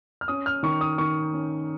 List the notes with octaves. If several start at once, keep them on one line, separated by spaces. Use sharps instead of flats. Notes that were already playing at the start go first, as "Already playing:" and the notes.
F6
C#4 D#6
F6
D#3 C#6
D#6
D#3 C#6
C#4